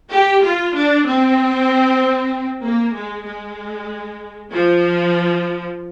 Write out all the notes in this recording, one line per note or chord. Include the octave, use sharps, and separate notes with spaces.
G4
F4
D4
C4
A#3
G#3
G#3
F3